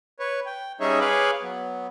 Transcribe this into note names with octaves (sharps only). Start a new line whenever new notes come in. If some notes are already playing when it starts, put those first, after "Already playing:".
B4 C#5
G5
G3 C#4 D#4 G#4 C#5 E5
G#4 B4 C#5 F5 B5 D6
F#3 B3